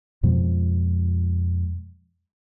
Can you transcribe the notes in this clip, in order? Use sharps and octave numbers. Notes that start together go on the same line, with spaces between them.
F2 B2 F3 G#3